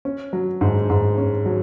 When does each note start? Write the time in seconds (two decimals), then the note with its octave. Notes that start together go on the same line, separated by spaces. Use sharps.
0.05 C#4
0.33 F#3
0.61 G#2
0.90 G#2
1.18 C#4
1.46 F#3